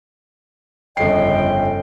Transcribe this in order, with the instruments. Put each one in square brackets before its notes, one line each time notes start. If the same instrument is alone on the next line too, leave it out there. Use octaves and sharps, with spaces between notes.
[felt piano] G1 C7 [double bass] F2 C#3 [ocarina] D#5 [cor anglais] G5